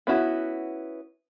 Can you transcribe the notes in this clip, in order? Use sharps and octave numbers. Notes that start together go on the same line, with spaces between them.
B3 C#4 E4 F#4